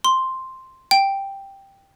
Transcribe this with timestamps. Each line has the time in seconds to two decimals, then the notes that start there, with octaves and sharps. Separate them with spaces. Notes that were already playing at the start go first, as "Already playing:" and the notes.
0.04 C6
0.91 G5